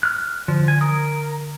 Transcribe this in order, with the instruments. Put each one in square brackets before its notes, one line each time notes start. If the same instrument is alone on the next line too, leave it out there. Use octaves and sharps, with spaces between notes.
[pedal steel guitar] F6 F#6
[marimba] D3 [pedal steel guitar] F3
[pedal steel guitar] G#5
[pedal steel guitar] A#4 [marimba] D#6